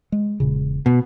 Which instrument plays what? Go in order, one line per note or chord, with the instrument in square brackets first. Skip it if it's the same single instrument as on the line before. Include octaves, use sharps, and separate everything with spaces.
[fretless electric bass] G#3
E1 A#2 C#3
[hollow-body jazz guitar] B2